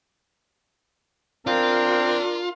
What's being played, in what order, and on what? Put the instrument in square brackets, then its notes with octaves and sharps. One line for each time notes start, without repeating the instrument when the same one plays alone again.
[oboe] C4 [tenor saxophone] D4 [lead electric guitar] F4 [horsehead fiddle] A#4